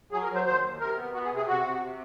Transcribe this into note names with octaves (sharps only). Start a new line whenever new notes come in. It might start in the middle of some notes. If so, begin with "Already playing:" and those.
F#3 G#4
A#4
F#3
C5
D#2 C5
D#2
C3 A#4
B3
B3 F#4
G#4
C3
G#4
C3 F#4
C3
C3